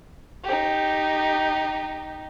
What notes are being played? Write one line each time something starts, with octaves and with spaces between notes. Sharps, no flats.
D#4 G4